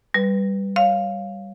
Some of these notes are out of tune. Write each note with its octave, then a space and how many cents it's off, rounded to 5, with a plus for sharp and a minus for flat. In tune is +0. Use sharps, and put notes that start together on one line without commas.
G3 +0 B4 +0
C#5 +0 F5 +0